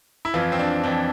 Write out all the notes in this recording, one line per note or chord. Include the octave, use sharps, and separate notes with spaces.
E4
F2 E3 F4
C4
D4
F2 E3 D4